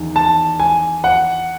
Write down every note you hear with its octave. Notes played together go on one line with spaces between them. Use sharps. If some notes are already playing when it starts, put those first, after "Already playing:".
Already playing: E2 D#3
A5
G#5
F#5